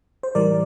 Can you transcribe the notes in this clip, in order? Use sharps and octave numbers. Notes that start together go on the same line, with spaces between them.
C5
A2 E3 G3 A#4 D5